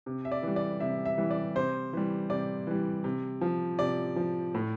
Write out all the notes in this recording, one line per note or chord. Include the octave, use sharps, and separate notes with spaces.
C3
E5
D5
E3 G3
D5
C3 E5
E5
E3 G3
D5
C3 C5
E3 G3
C3 D5
E3 G3
C3
F3
C3 D5
F3
A2